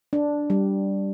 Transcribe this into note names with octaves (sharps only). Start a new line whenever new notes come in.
D4
G3